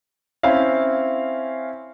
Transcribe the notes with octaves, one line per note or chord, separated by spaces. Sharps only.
C4 C#4 E4 F5